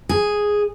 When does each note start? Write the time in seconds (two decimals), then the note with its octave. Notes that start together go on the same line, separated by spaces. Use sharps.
0.09 G#4